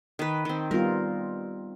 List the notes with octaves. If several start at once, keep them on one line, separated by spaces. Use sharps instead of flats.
D#3 B4
D#3 C4
G3 B3 F4 A#4